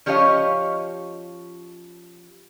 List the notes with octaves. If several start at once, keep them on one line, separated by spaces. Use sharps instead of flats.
F3 C#4 G4 C#5 D#5 F5